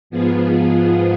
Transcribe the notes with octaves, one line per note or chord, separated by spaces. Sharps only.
G#2 F3 B3 F4 G#4